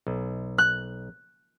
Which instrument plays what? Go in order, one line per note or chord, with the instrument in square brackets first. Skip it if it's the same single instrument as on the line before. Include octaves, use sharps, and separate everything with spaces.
[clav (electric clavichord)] B1
[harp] F#6